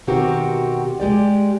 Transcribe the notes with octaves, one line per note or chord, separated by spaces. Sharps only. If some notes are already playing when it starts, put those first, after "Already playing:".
B2 D#3 C4 F#4 G4 A#4
G#3 G4 D5